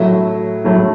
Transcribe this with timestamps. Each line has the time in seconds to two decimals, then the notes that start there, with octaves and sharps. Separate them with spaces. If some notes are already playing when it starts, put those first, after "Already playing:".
Already playing: A2 F#3 A3 E4
0.64 A2 F#3 A3 E4